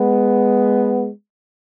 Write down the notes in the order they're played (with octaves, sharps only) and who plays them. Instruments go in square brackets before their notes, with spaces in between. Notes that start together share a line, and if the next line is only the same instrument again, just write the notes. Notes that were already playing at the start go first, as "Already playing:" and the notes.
Already playing: [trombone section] G#3 B3